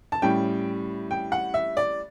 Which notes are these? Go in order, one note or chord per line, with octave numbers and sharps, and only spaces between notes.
A5
A2 G3 C#4 G5
G5
F#5
E5
D5